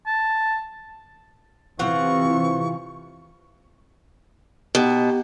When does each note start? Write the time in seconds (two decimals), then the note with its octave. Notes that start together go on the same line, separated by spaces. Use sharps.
0.07 A5
1.79 C3 E3 C4 F4 F#5 C#6
4.75 B2 D#4 G4